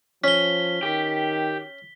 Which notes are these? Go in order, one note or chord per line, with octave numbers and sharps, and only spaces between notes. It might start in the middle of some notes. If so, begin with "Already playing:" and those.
F3 C#4 B6 G7
D#3 G4